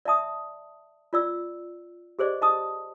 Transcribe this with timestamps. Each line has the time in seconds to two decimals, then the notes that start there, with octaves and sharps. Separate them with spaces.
0.05 D5 E5 A5 D#6
1.13 F4 D5 E6
2.19 G4 G#4 C5 D5 D#5
2.42 D#5 A5 D#6